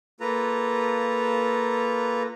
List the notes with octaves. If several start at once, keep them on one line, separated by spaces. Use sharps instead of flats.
A#3 F4 A4 B4 A#5